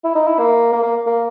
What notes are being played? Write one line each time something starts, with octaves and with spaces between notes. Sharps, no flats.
E4
D#4
E4
A#3
A#3
A#3
A#3